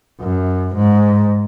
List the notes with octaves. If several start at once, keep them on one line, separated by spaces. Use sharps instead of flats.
F#2
G#2